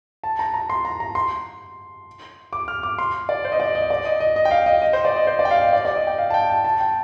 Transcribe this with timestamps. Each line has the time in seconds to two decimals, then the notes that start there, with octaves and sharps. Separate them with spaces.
0.23 A5
0.39 A#5
0.54 A#5
0.70 C6
0.85 A#5
1.00 A#5
1.15 C6
2.53 D6
2.68 F6
2.83 D6
2.98 C6
3.29 D5
3.45 C5
3.52 D#5
3.60 D5
3.75 D#5
3.90 D5
4.05 D#5
4.20 D#5
4.36 D#5
4.45 G5
4.51 F5
4.66 D#5
4.82 D#5
4.93 C5
5.05 D5
5.16 D#5
5.27 C5
5.39 D5
5.45 G5
5.51 F5
5.61 D#5
5.73 D5
5.85 D5
5.96 D#5
6.07 G5
6.18 F5
6.30 A5
6.34 G5
6.50 A5
6.65 A5
6.80 G5